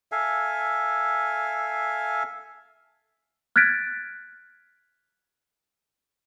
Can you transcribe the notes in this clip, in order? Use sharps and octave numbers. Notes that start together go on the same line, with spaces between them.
A4 E5 F5 G#5
F6 F#6 G#6 A6 B6 D7